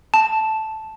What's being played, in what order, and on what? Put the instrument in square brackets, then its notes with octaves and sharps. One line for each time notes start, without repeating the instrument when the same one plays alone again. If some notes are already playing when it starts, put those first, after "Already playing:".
[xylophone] A5